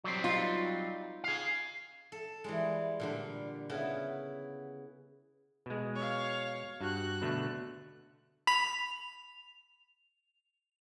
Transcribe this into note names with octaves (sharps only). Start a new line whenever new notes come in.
F#3 G3 C4
D#4 F4
G#4 F5
A4
E3 G3 G#3
A#2 D3 G3
C#3 B3 E4
B2 G#3
C#5 F5
G2 F#4 F#6
B2 D3 A3
B5 F7